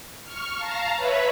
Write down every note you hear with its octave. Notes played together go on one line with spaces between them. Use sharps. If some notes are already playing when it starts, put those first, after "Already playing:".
C#6 F6
F5 A5 A#5
B4 C#5 E5 B5